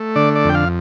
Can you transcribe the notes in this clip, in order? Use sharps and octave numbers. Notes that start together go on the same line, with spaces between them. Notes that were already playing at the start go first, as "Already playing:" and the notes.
Already playing: A3
D3 D5
D5
F2 G5
F5